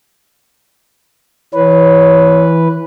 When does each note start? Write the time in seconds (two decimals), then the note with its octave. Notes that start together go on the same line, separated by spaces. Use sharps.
1.54 E3 B4 C#5